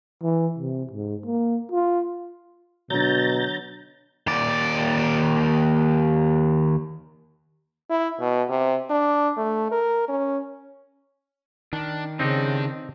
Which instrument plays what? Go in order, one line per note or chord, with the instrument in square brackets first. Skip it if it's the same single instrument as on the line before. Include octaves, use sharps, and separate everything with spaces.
[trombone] E3
C3
G#2
A#3
F4
[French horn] B2 [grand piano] D3 F#3 [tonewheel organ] A#5 G6 A6
[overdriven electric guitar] D#2 D5
[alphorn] E4
B2
C3
D4
A3
A#4
C#4
[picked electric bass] D#3 [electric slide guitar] D4
[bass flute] C#3 [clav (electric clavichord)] C4 D#4 [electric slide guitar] D4 G4